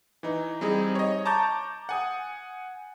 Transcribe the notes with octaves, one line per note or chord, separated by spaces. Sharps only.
E3 D#4
G3 C4 D#4 G#4
C#5 D#5
A5 A#5 C#6 D6 G6 A6
F#5 G#5 D#6